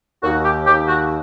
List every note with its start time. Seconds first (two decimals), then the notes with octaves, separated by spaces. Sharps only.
0.23 D#2 F#4
0.44 G4
0.66 D#2 G4
0.88 F#4